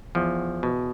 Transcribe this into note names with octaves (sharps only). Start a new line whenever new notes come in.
E2 F3
B2